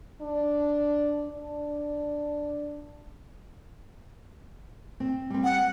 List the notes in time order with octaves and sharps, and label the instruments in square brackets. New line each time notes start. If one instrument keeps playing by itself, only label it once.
[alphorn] D4
D4
[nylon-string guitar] C4
G3 C4
[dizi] F#5